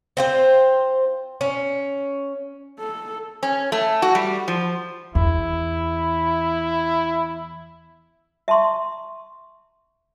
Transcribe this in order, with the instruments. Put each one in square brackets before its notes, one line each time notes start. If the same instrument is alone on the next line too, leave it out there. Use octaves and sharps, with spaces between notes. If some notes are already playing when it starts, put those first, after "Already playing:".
[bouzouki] C4 F4 C5
C#4
[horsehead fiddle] A4
[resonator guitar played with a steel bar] C#4
A3
F#4
G3
F3
[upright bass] E2 [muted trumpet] E4
[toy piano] E5 A5 A#5 C6 C#6